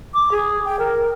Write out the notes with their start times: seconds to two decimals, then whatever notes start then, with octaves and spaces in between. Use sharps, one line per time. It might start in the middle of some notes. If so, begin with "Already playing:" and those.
0.14 D6
0.32 G#4
0.65 G5
0.79 A#4